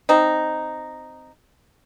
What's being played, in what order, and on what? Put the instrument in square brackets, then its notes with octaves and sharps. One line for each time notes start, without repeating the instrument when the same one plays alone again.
[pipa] C4 D#4